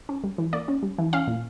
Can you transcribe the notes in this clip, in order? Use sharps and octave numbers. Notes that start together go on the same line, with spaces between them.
C#4
G3
E3
A#3 D5
C#4
G3
E3
C#4 F5
A#2